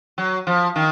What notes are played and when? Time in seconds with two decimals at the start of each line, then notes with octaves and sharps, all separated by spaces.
0.18 F#3
0.47 F3
0.76 D#3